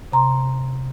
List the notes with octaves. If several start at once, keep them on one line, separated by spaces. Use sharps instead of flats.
C3 A#5 C6